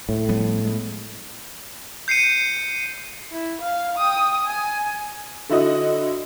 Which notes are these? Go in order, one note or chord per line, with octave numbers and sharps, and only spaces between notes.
A2
F3 G3 B3
G#3 A#3 B3
G6 C7 C#7 D#7
E4
F5
G5 D#6
G#5
D3 E4 F#4 D#5 D#6